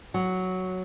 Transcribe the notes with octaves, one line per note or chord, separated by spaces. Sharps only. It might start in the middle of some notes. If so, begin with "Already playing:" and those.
F#3